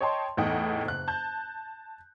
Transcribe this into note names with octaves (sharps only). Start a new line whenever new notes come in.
C#5 D#5 G5 A5 C6
E2 A2 D#4 D#5 F#5 G5
F#1 F#6
A5 G6